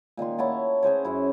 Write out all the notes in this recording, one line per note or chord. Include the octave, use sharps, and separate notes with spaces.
A#2 D#3 A#3 C6
E4 C#5 F#5 A5
C#4 G#4 C5 C#5
F#2 E4